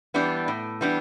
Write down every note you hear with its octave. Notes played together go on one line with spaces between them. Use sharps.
E3 G3 B3 D4
A2
E3 G3 B3 D4